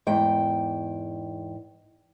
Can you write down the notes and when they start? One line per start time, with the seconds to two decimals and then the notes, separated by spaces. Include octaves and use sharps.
0.07 E2 G#2 G5